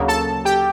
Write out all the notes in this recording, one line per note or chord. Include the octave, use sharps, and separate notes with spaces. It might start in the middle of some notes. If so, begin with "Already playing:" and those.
Already playing: D2 C#3 F#3 A#3
A4 A5
G4 G5